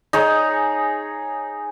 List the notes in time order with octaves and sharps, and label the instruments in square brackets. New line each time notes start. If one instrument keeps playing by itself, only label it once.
[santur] D#4 G#4 C#5